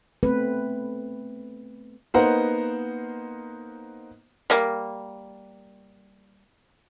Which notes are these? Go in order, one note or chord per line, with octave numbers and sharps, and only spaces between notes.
A3 B3 C4 B4
A#3 B3 D#4 A#4 C5 F#5
G3 A#3